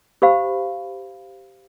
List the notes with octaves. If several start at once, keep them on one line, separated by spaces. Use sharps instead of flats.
G4 C5 F5 B5